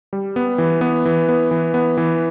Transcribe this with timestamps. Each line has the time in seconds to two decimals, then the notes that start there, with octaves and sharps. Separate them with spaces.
0.13 G3
0.36 B3
0.58 E3
0.81 B3
1.05 E3
1.29 B3
1.51 E3
1.74 B3
1.97 E3